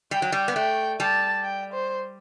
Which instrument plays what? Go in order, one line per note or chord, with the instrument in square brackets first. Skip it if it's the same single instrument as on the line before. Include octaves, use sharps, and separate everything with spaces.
[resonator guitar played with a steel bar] G3 [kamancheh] G5
[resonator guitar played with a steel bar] F#3
G3
B3
[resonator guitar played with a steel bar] A3 [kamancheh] G5
[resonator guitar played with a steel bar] G3 [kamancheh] A5
[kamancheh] G5
C5